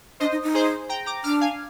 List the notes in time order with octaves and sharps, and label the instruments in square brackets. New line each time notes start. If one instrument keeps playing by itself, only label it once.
[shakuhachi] D4 [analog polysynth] C5 D#5
[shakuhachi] D#4
D#4
[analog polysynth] G#4 C5
G5 A#5
A#5 D6
[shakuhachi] D4 [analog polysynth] D6 F6
[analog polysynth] F5 G#5